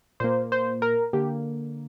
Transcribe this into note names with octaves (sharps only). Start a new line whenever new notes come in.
A#2 A#3 C5
C5
A#4
D3 A#3 G4